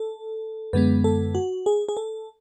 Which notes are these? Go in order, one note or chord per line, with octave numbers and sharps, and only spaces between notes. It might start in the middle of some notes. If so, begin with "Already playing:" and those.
Already playing: A4
F#2 D3 G#3 B3 B4
A4
F#4
G#4
G#4
A4